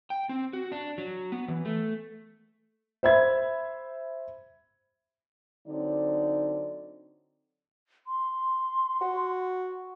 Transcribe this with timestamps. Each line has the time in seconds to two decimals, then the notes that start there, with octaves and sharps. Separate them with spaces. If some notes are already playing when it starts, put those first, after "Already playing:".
0.10 G5
0.29 C4
0.53 F#4
0.72 D4
0.98 F#3
1.32 B3
1.48 E3
1.65 A3
3.03 C5 E5 B5 G#6
5.67 D3 F#3 C4 D#4 D5
8.07 C6
9.01 F#4